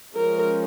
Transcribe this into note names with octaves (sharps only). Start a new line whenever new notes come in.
F3 G#3 C#4 A#4